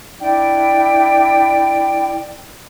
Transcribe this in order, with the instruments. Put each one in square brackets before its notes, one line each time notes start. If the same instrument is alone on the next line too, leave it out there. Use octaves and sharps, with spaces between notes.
[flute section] D4 E4 D5 G5